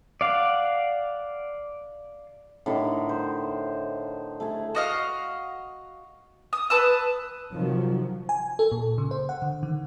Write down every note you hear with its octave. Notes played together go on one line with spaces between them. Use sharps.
D5 F5 F#5
A2 D3 D#3
C5
A3 G#4
F#4 D#5 F5
D#6
B4 A5 D#6 E6
C3 D#3 F3 F#3
G#5
A4
A#2
C#3
C5
F#5
D3
D#3